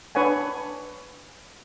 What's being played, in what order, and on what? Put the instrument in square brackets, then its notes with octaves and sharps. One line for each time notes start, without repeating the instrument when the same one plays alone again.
[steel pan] D4 B4 C#5 F#5 G#5